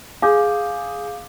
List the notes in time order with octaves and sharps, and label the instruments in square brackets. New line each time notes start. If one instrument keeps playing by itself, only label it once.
[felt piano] G#4 [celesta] F5 D6 G6